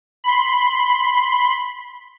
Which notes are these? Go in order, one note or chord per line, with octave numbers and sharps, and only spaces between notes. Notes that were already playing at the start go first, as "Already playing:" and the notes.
B5 C6